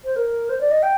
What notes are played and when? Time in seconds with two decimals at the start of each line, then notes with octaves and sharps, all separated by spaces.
0.04 C5
0.16 A#4
0.49 C5
0.61 D5
0.71 D#5
0.82 G5